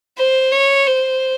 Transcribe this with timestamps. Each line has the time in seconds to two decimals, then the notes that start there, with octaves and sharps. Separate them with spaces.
0.17 C5
0.52 C#5
0.87 C5